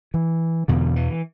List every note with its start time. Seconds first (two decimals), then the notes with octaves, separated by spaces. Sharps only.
0.14 E3
0.68 E2 B2 D3
0.96 E3